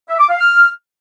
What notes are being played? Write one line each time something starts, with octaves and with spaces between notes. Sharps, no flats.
E5
D6
F5
F6